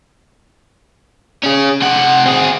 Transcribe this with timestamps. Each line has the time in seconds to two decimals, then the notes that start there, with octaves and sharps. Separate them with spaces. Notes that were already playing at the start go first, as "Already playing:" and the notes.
1.44 C#4 G#4
1.82 C3 F#5
2.25 C4 G#4